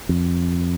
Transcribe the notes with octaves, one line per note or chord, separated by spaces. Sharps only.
F2